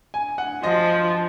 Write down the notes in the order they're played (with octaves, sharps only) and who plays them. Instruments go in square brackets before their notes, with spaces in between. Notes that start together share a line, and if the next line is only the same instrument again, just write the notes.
[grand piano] G#5
F#5
[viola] F3 [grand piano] D#5